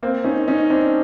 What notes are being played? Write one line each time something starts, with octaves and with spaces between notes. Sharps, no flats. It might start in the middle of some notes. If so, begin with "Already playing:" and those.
A#3 C4
C#4 D#4
C#4 D#4
C4 D4